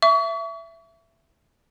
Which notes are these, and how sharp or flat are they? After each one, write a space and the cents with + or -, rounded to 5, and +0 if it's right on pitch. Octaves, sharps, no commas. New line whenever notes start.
E5 +15 C#6 +40